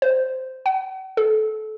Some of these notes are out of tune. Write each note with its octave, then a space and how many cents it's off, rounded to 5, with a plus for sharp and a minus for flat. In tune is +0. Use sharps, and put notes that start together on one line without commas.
C5 -10
F#5 +45
A4 -25